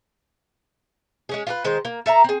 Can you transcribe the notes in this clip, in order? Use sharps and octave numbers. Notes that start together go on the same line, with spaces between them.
G#3 C#4 G#4
F4 G4 B4
D#3 G#3 C5
A#3
A4 E5 F5 A#5
C4 G#4